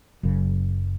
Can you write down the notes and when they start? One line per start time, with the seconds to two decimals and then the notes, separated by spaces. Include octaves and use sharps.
0.23 F#1 F#2 C#3